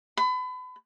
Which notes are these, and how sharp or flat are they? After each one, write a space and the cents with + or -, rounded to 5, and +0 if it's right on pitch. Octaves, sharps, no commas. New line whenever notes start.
B5 +35